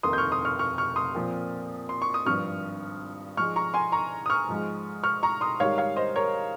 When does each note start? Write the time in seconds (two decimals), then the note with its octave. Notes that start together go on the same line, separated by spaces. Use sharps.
0.03 F1 D#2 D#3 C6 D#6
0.13 G6
0.18 C#6 F6
0.32 C6 D#6
0.45 C#6 F6
0.59 C#6 F6
0.78 C#6 F6
0.96 C6 D#6
1.15 A#2 F3 C4
1.89 C6
2.02 C#6
2.14 D#6
2.25 G#1 G2 F3 C#6 F6
3.37 G#2 F3 G#3 C#6 F6
3.56 A#5 C#6
3.74 G#5 C6
3.92 A#5 C#6
4.26 D#6
4.30 C#6 F6
4.49 G#2 F3 G#3
5.03 C#6 F6
5.23 A#5 C#6
5.41 C6 D#6
5.60 G#2 D#3 G3 C#5 F5
5.78 C#5 F5
5.96 C5 D#5
6.16 A#4 C#5